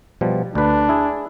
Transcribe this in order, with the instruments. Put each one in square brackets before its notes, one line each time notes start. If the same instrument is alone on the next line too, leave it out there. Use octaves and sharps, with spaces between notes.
[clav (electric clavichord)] B2 F3 G3
[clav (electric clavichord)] D2 B4 [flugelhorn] D4
[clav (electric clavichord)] E4 G#4